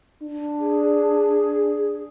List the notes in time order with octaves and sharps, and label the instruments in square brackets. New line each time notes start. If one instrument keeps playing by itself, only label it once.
[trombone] D4
[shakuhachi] G#4